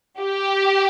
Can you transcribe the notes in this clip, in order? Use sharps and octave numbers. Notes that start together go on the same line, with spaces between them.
G4